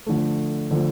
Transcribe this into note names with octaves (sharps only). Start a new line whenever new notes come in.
D3 F3 A3
D3 F3 A3